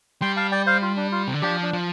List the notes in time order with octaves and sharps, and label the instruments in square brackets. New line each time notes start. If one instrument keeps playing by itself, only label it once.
[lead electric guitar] G3 [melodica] G5 C6
[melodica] F5 A5
D5 G5
C5 F5
F4
D4
F4
[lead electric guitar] C3
D3
[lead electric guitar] F3 [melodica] D4 G4
[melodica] D4
[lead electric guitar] F3